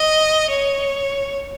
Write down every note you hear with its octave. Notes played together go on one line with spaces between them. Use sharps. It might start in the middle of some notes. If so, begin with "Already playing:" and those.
Already playing: D#5
C#5